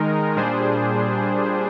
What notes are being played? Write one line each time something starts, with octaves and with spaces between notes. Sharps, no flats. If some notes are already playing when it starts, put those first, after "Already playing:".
Already playing: D#3 G#3 D#4 A#4
A#2 G3 D4 G#4 C5